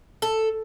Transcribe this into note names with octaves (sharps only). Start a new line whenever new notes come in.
A4